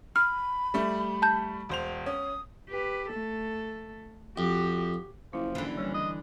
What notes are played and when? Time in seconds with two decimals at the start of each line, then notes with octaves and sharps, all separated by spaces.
0.16 B5 F6
0.74 G3 A3
1.22 A5 G6
1.69 E1 C5 F7
2.06 C#4 D#6
2.69 G4 B4
3.10 A3 A4
4.38 F2 F#4 G4
5.33 F#1 F3 E4
5.55 D3 E3
5.78 G3 C#4
5.94 D#5